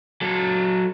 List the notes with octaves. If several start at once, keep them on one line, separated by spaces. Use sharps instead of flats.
F#3 A4